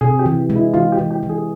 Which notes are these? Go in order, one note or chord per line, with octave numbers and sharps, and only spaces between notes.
C3 G#4
G4
E3
G#3
E4
E3 F4
G4
E3
G4
E3
G#4